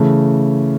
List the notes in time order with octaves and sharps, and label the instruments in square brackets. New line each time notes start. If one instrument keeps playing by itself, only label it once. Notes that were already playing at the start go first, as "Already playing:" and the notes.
Already playing: [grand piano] C#3 E3 A3